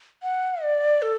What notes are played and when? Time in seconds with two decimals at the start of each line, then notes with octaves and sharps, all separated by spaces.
0.23 F#5
0.63 D5
1.02 A4